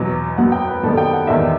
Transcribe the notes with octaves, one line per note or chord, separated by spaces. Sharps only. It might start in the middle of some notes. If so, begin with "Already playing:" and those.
Already playing: E2 B2 F#3
F#2 F#3 B3 F#5
G5
B4
F#2 D#3 G3 B3 A4
G5
F#5
E2 D#3 G3 E5